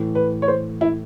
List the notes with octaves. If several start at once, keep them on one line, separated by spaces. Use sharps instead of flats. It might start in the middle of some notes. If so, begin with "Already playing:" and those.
Already playing: A2 E3 A3
B4
C#5
C5
E4